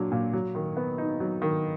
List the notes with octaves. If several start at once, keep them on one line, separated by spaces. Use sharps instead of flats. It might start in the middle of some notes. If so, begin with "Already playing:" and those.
Already playing: A#2 F#3 D4
A#2
F#3
D#3
B3
D#4
F#3
D#3